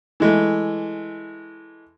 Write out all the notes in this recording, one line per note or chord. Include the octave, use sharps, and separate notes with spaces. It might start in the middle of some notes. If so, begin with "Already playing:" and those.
E3 G#3 A3